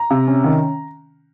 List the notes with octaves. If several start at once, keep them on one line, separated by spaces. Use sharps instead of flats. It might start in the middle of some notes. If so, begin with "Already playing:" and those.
Already playing: A#5
C3
C#4
D#3